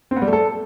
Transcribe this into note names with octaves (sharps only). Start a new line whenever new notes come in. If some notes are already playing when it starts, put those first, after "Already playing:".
C4
B3
G3
A3
A4